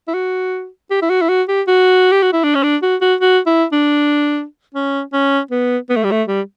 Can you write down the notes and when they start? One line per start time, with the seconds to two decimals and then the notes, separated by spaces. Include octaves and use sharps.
0.08 E4
0.14 F#4
0.91 G4
1.02 E4
1.10 F#4
1.22 E4
1.29 F#4
1.48 G4
1.67 F#4
2.11 G4
2.23 F#4
2.33 E4
2.44 D4
2.55 C#4
2.63 D4
2.82 F#4
3.01 F#4
3.21 F#4
3.46 E4
3.72 D4
4.74 C#4
5.13 C#4
5.51 B3
5.90 B3
5.96 A3
6.04 G3
6.11 A3
6.28 G3